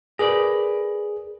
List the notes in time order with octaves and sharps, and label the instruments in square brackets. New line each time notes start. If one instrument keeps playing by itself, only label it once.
[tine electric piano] G#4 [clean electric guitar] A#4 B4 D5